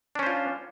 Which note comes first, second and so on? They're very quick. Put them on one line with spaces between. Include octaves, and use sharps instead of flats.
D4 C#4 C5 F4